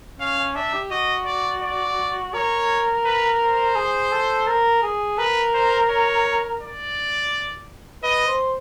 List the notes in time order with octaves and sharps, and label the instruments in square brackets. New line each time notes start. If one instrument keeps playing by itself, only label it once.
[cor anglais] C#4 [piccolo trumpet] F5
[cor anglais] C#4
[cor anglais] D4 [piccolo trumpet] E5
[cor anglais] G4
[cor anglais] F#4 [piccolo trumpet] D#5
[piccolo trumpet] D5
D5
[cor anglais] A#4 [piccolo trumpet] C#5
[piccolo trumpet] B4
C5
[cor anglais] G#4
A4
A#4
G#4
[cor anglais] A#4 [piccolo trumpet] B4
[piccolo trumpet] C5
C#5
D5
[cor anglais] B4 [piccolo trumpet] D#5
[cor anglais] C5